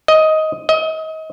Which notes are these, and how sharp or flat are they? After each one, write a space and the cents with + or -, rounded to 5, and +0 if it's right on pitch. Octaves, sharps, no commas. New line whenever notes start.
D#5 +10
D#5 +30